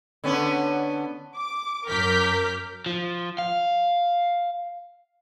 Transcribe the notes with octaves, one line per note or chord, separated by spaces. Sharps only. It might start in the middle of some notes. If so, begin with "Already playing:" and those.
D3 B3 C#4
D6
F#2 A#4 D6 F6 G6 B6
F3
F5